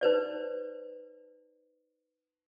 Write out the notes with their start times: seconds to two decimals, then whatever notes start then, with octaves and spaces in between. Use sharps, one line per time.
0.01 D#4 B4 C5 D5